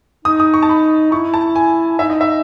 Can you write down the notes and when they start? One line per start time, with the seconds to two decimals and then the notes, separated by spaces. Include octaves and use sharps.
0.25 D#4 D#6
0.40 D#6
0.54 C#6
0.63 A5
0.69 B5
1.12 E4 C#6
1.34 A5
1.55 G#5
1.99 D#4 E5
2.10 D#5
2.21 E5